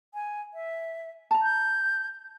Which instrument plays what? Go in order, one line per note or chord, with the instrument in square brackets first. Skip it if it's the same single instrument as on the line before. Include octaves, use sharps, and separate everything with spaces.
[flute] G#5
E5
[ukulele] A5 A#5
[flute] G6